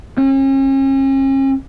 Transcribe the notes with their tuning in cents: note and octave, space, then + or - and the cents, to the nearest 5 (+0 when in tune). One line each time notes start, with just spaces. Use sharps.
C#4 -40